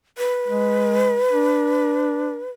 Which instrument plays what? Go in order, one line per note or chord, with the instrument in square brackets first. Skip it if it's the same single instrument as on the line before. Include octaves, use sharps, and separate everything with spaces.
[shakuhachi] B4
[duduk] G#3
D4